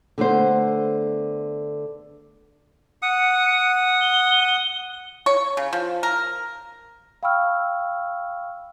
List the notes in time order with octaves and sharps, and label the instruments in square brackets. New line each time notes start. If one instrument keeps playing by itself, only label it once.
[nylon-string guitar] D3 A3 B3 C5
[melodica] F#5 D#6 [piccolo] C#7
[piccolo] G7
[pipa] C#5
C#3
F3
A#4
[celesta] F5 G5 B5 C#6 E6 F6